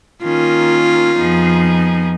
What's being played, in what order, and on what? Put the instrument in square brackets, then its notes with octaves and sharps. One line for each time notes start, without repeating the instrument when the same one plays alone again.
[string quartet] D#3 A#3 C#4 [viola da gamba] F4
[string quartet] F2 F3 B3 D#4 G#4